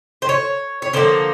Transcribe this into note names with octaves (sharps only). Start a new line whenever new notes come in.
C5
C#5
C#5
D3 F3 A#3 C5